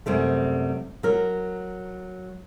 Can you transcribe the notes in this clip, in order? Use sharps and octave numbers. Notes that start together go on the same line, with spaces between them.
F#2 C3 G3 A3
F#3 A#4